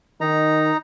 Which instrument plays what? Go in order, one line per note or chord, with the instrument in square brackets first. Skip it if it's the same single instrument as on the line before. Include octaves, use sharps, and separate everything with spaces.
[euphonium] D#3 [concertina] D#4 A#5